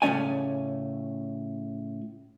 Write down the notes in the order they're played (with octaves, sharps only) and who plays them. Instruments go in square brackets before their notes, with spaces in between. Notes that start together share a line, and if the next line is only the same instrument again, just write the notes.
[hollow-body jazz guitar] A2 C#3 A3 C#4 D5 G#5